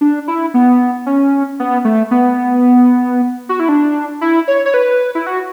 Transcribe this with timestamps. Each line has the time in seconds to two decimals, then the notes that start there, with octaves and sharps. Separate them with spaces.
0.01 D4
0.28 E4
0.54 B3
1.06 C#4
1.60 B3
1.85 A3
2.11 B3
3.49 F#4
3.60 E4
3.69 D4
4.21 E4
4.48 C#5
4.66 C#5
4.74 B4
5.15 E4
5.27 F#4